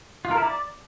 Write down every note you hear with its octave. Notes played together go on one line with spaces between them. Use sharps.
F4
A#4
E4
D5